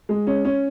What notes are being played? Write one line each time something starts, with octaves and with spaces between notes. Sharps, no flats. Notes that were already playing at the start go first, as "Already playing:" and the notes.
G#3
C#4
C#4